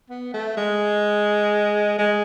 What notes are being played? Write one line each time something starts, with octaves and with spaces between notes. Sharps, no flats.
B3
A3
G#3
G#3